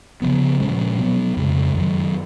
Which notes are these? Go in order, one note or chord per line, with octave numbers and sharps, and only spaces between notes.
C#3 F3 B3
A#2 F3 G#3 C#4
B2 F#3 B3
F2 C#3 G#3
F#2 D#3 F#3